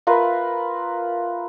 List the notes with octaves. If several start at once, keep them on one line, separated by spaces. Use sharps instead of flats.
F4 A#4 B4 E5